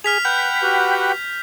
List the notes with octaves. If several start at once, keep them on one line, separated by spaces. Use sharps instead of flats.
G#4 F6 B6 F7
B4 F#5 G5 B5 G6
F#4 G4 B4